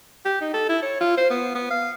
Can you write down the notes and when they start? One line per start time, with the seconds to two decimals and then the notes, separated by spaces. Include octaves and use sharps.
0.25 G4
0.41 D#4
0.54 A4
0.69 E4
0.82 C#5
1.01 F4
1.17 C5
1.30 B3
1.54 B3
1.70 F5